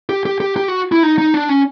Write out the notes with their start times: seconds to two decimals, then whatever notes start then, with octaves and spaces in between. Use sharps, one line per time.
0.09 G4
0.25 G4
0.40 G4
0.57 G4
0.68 F#4
0.92 E4
1.03 D#4
1.18 D#4
1.34 D4
1.49 C#4